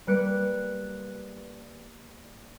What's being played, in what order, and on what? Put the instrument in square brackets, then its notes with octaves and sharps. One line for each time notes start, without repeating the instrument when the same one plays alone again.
[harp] G3 A#3 B4 F#6 C#7 D7